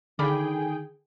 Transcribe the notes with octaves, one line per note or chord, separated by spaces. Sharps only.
D3 D#3 G#4 D5 F5 G5 B5